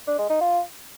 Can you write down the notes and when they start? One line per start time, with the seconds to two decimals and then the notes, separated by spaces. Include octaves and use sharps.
0.07 D4
0.18 G#3
0.30 D#4
0.41 F4